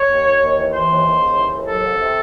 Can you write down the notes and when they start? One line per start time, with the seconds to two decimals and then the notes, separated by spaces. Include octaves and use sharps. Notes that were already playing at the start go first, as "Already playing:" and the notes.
Already playing: C#5
0.10 D#2
0.25 D#2
0.41 D#2
0.57 E3
0.73 E3 C5
0.89 D#2
1.05 D#2
1.20 C#3
1.36 E3
1.52 D#2
1.68 F#3 A4
1.83 C2
2.00 C3